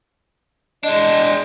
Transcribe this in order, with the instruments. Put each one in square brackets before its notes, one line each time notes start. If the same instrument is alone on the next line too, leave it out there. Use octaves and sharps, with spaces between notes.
[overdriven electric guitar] G#3 D4 [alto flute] D#5